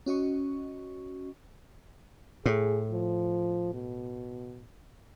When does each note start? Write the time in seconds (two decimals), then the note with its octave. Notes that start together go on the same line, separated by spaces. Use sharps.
0.06 C#4 F#4 D#5 C#6
2.46 A2 G#4
2.91 F3
3.73 B2